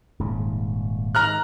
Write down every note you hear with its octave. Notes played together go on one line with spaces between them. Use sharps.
D#1 G#2 C#3
G#2 D#3 A#5 F6 F#6